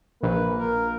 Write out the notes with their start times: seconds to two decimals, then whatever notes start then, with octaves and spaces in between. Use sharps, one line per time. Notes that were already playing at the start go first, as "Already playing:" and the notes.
0.23 A#1 A#3 B4
0.58 A#4